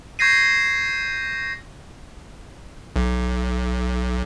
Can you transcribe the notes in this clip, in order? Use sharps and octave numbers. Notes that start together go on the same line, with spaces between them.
C#6 G6 G#6 A#6 C7 D#7
B1